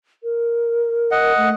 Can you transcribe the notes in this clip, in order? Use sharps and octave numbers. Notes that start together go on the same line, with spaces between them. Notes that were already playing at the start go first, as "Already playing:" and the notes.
A#4
D#5 F#5
A3